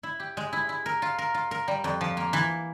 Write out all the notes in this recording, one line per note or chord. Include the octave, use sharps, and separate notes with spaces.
E4
G4
G#3
E4
E4
A#4
F4
A#4
F4
A#4
G3
F2
F3
A#3
E3